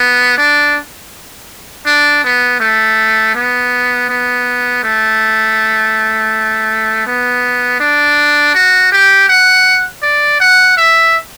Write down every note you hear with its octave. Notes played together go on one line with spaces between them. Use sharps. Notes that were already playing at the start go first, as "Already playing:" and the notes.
Already playing: B3
D4
D4
B3
A3
B3
B3
A3
B3
D4
F#4
G4
F#5
D5
F#5
E5